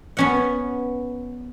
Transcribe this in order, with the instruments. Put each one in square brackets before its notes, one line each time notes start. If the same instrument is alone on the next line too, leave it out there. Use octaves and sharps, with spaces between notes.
[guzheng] B3 C#4 F#5